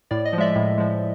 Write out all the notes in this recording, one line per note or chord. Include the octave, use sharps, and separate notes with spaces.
A2 D5
D#5
F3
G#3 D5 E5
A2
F3 G#3